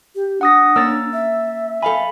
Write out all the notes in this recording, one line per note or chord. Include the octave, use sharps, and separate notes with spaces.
G4
D4 F#5 D#6 A#6
A#3 C#4 A#4 E6 A6
E5
A4 F5 G#5 B5